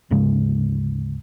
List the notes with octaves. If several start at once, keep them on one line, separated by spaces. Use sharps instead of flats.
D2 G#2 C#3 G#3